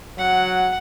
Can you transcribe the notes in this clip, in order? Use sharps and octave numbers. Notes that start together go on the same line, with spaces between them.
F#3 F#5